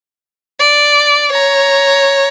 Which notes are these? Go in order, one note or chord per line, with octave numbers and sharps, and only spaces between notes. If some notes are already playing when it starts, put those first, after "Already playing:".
D5
C#5 A#5